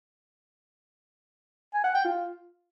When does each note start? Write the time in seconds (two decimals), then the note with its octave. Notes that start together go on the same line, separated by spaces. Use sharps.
1.74 G#5
1.84 F#5
1.94 G5
2.05 F4